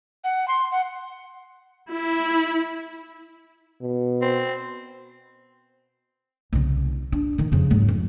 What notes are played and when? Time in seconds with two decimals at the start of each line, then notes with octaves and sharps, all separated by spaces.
0.24 F#5
0.48 C6
0.71 F#5
1.90 E4
3.82 B2
4.22 C4
6.53 C2 C#3
7.12 D4
7.38 D3 D#3
7.52 F2 C#3
7.71 G#2 F#3
7.89 F1